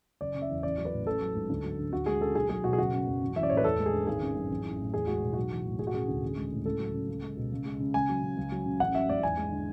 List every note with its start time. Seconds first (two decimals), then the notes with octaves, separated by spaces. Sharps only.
0.21 F#1 D5
0.35 C#3
0.42 E5
0.49 E2
0.63 A1 D5
0.78 F#3
0.85 B4
0.92 A2
1.07 A1 A4
1.21 F#3
1.35 G#2
1.50 D2
1.64 F#3
1.79 D3
1.92 D2 F#4
2.06 G#3 G#4
2.21 C#3 A4
2.35 B1 G#4
2.49 F#3 G#4
2.64 B2 F#4
2.73 G#4
2.78 F#1 F#4
2.93 C#3
3.07 F#2
3.22 A1
3.36 E3 E5
3.43 D5
3.50 A2 C#5
3.57 B4
3.64 E2 A4
3.79 G#3
3.86 G#4
3.93 D3
4.07 G#1 G#4
4.21 C#3
4.36 F#2
4.50 A1
4.65 E3
4.79 A2
4.93 E2 G#4
5.07 G#3 F#4
5.22 B2
5.33 B1 F#4
5.50 E3
5.65 A2
5.79 E1 G#4
5.87 F#4
5.94 C#3 G#4
6.08 D2
6.23 A1
6.37 G#3
6.52 A2
6.65 C#2 A4
6.79 F#3
6.94 C#3
7.09 C#2
7.22 G#3
7.37 B2
7.52 C#2
7.65 G#3
7.80 C#3
7.94 C#2 G#5
8.09 F#3
8.23 C#3
8.37 C#2
8.52 F#3
8.66 C#3
8.80 A1 F#5
8.95 F#3 E5
9.09 G#2 D5
9.23 E2 G#5
9.37 G#3
9.52 D3